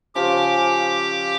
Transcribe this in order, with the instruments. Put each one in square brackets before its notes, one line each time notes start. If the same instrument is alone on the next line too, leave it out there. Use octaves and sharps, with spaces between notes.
[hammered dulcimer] C#3 F3 [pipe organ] G4 D6